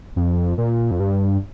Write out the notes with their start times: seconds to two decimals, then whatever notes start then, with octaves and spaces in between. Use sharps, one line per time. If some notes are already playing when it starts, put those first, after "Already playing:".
0.16 F2
0.58 A#2
0.91 F2
1.00 G2